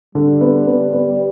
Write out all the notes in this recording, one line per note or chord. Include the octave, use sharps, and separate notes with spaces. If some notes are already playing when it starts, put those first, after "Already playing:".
D3 G3
B3
B3
B3